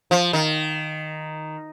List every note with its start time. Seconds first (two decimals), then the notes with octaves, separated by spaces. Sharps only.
0.11 F3
0.33 D#3